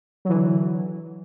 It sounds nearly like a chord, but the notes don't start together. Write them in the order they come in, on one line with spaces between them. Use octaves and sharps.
F#3 E3 D3